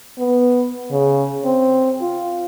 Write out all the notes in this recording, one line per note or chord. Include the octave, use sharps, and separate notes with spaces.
B3
C#3
C4
F4